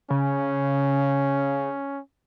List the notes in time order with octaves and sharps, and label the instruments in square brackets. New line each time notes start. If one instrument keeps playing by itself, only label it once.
[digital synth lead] C#3 [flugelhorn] C#4